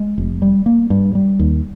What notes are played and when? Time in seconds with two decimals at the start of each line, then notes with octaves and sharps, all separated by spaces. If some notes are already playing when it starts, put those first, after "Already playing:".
Already playing: G#3
0.18 F1
0.42 G3
0.66 A#3
0.90 G2
1.15 G3
1.39 D#2